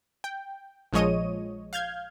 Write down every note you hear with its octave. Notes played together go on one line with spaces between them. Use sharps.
G5
A#1 F3 G#3 C#5 D#5 D#7
F5 F6 G6 G#6